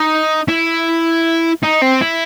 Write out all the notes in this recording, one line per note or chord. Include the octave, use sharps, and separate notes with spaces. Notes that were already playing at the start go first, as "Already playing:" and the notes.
Already playing: D#4
E4
D#4
C4
E4